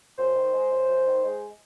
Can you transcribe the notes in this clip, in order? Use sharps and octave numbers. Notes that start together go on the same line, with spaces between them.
F#2 C5
D#3
G#3
F#2
F#2
D#3
G#3